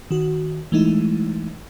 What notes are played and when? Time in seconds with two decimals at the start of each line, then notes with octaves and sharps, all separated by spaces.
0.11 D#3 F#4
0.72 E3 G#3 A3 D#4 E4